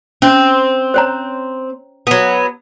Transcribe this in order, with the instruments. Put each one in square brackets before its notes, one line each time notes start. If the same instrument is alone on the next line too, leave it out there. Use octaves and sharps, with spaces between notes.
[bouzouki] C4 [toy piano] C#4
[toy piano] C5 C#5 A#5
[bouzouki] F#3 B3